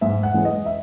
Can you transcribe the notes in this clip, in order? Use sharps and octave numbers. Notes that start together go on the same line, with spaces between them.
G#2 E5
F#5
E3 G#3 C#4
D#5
E5